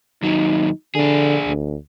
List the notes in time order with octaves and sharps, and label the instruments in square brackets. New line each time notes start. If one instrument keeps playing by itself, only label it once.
[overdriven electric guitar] D#2 F#3 [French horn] D#4
[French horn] D3 [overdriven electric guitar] D4 G#4
[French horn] D2